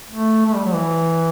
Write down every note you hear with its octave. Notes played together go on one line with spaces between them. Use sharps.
A3
A3
G3
F#3
E3